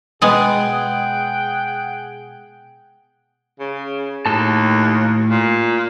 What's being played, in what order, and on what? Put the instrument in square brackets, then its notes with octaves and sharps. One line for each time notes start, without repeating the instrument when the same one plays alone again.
[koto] B2 G#3 B3 [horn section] G#4 F#5 G5
[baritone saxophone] C#3
[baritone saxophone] D#2 [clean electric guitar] A2 A4 A5
[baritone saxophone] A#2